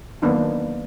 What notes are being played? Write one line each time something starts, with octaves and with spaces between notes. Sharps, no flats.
D#3 F#3 A#3 B3 D4 D#4